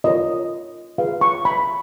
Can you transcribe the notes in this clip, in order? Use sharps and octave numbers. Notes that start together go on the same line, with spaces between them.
F4 A#4 C#5 D#5
F4 G#4 B4 F5
C#6
B5